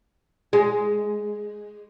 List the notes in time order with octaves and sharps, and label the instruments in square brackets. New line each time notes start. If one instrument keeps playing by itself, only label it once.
[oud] G#3